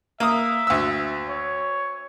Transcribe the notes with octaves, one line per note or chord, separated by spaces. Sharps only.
A#3 E5 D#6
D2 E6
C#5